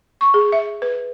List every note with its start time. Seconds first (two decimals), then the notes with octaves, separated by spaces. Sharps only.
0.21 C#6
0.34 G#4
0.52 E5
0.82 B4